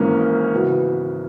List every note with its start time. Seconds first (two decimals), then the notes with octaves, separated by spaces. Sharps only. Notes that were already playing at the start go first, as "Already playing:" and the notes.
Already playing: G#1 G#2 E3 A#3 C#4
0.52 C#3 E3 B3 F#4 B4